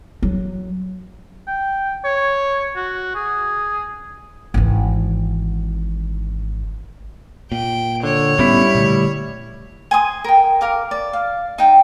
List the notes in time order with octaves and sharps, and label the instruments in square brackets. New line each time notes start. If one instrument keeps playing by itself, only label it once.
[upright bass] F#3
[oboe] G5
C#5
F#4
G#4
[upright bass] G#1 E3
[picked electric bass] A#2 [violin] G5
[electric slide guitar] D3 [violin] C#5
[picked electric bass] A2 B3 C#4 [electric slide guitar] G3 E4
[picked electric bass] A#2 D3 A3
[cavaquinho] G#5 C6 D#6
A#4 G5
A#4 F5 D6
D5
F5
D#4 G5